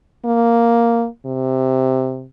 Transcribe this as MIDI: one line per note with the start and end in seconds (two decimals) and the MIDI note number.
0.25 1.06 58
1.26 2.25 48